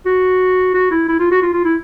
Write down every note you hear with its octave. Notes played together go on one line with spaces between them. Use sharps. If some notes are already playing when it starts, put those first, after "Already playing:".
F#4
F#4
E4
E4
F4
F#4
F4
F4
E4